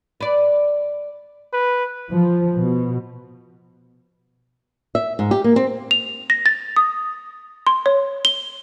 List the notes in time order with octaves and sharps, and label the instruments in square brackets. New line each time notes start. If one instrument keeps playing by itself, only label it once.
[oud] B4 D5
[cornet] B4
[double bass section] F3
B2
[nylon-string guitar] E5
G#2
G4
A#3
C4
[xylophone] F7
A#6
A6
D#6
C6
C#5
G7